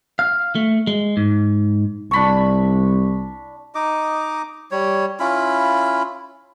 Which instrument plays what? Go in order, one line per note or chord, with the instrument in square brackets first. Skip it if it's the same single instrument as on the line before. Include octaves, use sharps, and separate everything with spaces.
[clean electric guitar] F5
A3
G#3
G#2
[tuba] C2 [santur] D4 B5 C#6
[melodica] D#4 D#5 D6
G3 C#5
C#4 E4 F4 B5